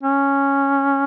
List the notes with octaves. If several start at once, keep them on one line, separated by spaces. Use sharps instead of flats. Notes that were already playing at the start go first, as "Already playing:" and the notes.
C#4